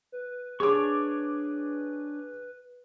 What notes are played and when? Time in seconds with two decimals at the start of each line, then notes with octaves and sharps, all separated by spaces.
0.12 B4
0.60 D4 G#4 C#5 C#6 D6